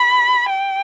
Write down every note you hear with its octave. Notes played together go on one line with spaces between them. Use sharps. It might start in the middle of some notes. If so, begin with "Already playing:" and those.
Already playing: B5
G5